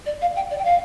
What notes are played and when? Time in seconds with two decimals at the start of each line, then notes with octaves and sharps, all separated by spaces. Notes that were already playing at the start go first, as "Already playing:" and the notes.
0.06 D5
0.22 F5
0.36 G5
0.50 D5
0.59 G5
0.65 F5